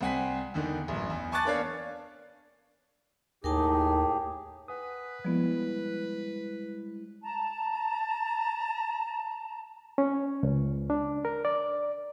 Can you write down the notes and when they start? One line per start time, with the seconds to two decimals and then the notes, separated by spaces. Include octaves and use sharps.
0.01 C2 C4 F#5 G#5 B6
0.54 E2 D3 D#3
0.88 A1 F#2
1.10 E2
1.32 G#5 A5 C#6 D6 F#6 A6
1.45 A#3 B3 D4 C#5 D5 F5
3.44 D#2 A2 D#4 G4 G#4 A#4 G5 A5
4.68 B4 F#5 G#5 D#6
5.24 F3 G3 G#3 B3 E4
7.22 A5 A#5
9.98 C#4
10.43 C#2
10.90 D4
11.25 A#4
11.45 D5